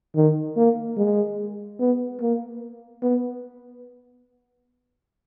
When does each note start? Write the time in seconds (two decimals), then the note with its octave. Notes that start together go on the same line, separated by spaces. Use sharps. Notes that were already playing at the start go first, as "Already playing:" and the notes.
0.16 D#3
0.57 A#3
0.98 G#3
1.80 B3
2.21 A#3
3.03 B3